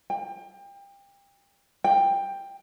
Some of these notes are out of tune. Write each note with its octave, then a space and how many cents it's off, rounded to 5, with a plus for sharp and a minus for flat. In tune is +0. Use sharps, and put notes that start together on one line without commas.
G5 +30
G5 +10